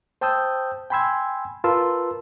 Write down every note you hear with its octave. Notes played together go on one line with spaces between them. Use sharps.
C5 G5 A5 D#6 E6 G6
G5 G#5 B5 C6 E6 G#6
F4 A#4 B4 A5 C6 E6